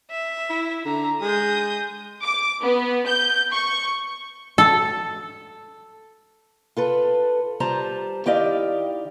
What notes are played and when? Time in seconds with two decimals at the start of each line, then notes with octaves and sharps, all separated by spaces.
0.11 E5
0.50 E4
0.85 D3 A#5
1.21 G#3 D#6 G6
2.23 D6
2.63 B3
3.08 G6
3.53 C#6
4.58 A4
6.77 F4 A4 B4
7.60 G3 F4 C5 A5 A#5
8.26 D#3 E4 G4 D5 D#5 F5